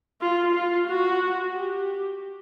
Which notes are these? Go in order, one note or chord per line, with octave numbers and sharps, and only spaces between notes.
F4
F4
F#4
G4